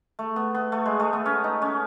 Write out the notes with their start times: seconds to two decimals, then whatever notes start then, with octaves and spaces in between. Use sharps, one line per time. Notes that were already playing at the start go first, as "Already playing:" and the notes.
0.19 A3
0.36 B3
0.55 B3
0.72 A3
0.86 G#3
1.00 A3
1.13 B3
1.26 C#4
1.44 D#4
1.62 C#4